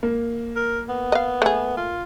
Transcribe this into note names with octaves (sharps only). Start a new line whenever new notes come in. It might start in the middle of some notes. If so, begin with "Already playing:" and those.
A#3
A#4
B3
D#5 F5
A3 G#4
F4